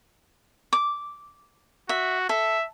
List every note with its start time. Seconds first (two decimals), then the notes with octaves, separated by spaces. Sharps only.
0.73 D6
1.89 F#4 E5
2.29 A4 E5